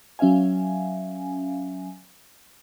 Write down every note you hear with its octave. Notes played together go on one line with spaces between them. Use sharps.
F#3 C#4 E5 F5 G#5